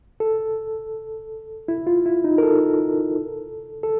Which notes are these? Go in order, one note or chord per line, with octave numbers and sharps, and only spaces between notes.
A4
E4
F4
E4
D#4
A#4
A4
A4